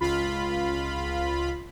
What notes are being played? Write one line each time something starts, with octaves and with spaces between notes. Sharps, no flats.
C#2 F4 B5